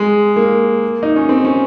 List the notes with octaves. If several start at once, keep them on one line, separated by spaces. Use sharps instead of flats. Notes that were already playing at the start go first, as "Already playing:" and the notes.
Already playing: G#3
A#3
D#4
C#4
C4
C#4